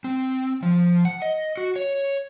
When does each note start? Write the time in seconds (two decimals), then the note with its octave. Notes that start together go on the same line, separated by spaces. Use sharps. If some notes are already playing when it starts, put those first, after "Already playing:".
0.04 C4
0.63 F3
1.05 F#5
1.22 D#5
1.57 F#4
1.76 C#5